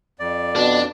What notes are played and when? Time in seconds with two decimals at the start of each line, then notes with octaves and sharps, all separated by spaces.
0.19 F2 D5
0.56 B2 D4